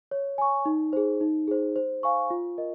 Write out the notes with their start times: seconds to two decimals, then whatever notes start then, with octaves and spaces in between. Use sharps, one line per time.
0.11 C#5
0.38 G#5 C#6
0.66 D#4
0.93 G#4 C5
1.21 D#4
1.48 G#4 C5
1.76 C5
2.03 F5 G#5 C#6
2.30 F4
2.58 A#4 D#5